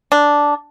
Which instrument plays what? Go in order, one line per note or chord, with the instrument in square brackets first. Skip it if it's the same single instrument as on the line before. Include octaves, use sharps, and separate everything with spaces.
[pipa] D4